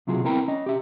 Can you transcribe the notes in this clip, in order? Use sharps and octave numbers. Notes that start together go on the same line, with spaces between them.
B1 C3 F#3 F4 F#4 G#4
B3 C4 E4 A#4 G5 A#5
C#4 D#5
G4 E5